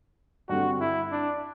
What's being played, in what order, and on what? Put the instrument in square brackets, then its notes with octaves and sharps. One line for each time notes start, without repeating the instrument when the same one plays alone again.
[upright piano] G2 D3 G3 C4 [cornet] F#4
[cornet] E4
D4